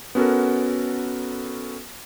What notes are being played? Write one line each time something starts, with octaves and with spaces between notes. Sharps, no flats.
B3 C#4 F#4 A4 A#4